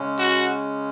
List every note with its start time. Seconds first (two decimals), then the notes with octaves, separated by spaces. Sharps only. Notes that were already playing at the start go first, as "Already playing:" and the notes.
Already playing: C#3 G#3 C#4
0.19 F#4